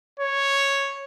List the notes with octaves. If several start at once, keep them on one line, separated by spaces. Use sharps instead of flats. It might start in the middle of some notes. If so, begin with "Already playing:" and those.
C#5